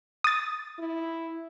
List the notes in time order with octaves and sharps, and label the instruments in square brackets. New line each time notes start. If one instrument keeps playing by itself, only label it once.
[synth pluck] D#6 A6
[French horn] E4